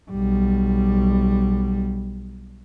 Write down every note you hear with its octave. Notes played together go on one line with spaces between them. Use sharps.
B1 G3